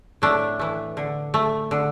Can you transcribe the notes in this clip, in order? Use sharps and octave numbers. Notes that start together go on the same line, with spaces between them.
A2 A3 D4
E3 A3
D3
A3
D3